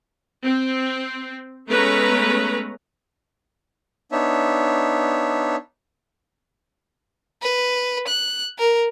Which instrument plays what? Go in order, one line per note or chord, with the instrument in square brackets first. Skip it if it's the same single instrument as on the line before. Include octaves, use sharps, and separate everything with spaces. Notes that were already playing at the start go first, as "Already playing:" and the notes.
[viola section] C4
G#3 A3 B3 C#4 B4 A#5
[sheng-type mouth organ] B3 D4 D#4 C#5 E5
[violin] B4
F#6
A#4